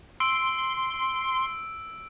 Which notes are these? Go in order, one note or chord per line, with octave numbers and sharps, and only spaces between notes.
C6 E6 D7